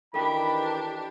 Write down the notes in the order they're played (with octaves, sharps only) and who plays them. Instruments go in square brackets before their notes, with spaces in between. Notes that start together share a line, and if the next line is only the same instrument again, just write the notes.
[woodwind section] D#3 E3 [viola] D4 G4 [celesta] A4 G5 [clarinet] B5